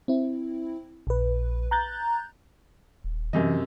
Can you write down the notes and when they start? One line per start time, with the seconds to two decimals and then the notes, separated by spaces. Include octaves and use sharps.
0.08 C4 E4
1.07 A#1 B4
1.71 A#5 F#6 G6 A6
3.04 D#1
3.33 F#2 C3 E3 D#5